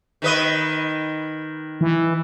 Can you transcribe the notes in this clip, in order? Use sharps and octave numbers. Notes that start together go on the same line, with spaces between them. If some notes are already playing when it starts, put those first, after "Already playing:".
D#3 B4 D#5
E3